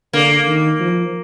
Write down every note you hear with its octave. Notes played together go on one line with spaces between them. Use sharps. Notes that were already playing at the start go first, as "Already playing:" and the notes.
D3 A#3
D#3
F3